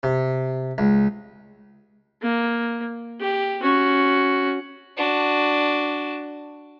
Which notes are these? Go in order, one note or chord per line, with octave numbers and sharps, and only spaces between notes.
C3
C#2
A#3
G4
C#4 F#4
D4 F#4